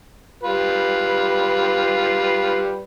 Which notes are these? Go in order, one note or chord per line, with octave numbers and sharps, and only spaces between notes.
G3 F4 B4